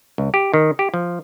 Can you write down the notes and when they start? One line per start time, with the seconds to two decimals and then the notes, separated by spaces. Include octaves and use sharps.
0.18 C#2
0.34 G4
0.54 D#3
0.79 G4
0.94 F3